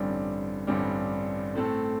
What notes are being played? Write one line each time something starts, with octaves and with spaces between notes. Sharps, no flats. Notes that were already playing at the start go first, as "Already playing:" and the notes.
Already playing: A1 G2 D3 G3 C4
A1 G2 D3 G3 C4
A2 A3 C4 A4